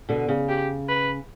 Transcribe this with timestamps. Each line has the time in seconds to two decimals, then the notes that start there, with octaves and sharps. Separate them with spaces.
0.09 B2 D3
0.28 C#3
0.49 G4
0.89 B4